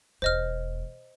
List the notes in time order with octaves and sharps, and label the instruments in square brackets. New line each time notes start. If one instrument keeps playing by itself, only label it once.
[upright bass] E1 E2 [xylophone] C5 D#5 F6